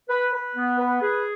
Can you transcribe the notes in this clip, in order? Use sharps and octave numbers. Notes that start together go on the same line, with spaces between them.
B4
B4
B3
B4
G#4